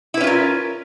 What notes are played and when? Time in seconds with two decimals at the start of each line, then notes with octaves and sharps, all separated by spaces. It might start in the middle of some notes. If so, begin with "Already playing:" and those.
0.14 E4
0.17 B4
0.21 C#4
0.24 F4
0.27 A#4